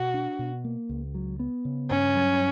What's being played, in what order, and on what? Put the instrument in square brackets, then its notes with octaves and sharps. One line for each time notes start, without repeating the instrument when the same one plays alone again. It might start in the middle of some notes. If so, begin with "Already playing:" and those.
Already playing: [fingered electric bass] B2 [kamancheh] F#4
[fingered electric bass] D4
B2
A#3
C#2
F#3
B3
C#3
[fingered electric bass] G2 [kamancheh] C#4
[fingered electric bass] F#3